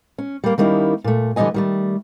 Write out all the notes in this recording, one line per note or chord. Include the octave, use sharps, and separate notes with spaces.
C#4
G3 A#3
D#3 G3 A#3 C#4 D#4 E4
A#2 A3
D3 E3 G3 D#4 D#5 G#5
D#3 G3 A3